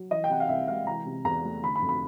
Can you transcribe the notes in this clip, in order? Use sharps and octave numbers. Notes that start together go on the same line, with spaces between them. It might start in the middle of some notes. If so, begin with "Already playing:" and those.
Already playing: F#3
E3 D#5
G5
C3 F#5
F5
C2 E5
G#3 F5
E3 A#5
C3
E2 A#5
A3
D3 B5
B5
F2
B5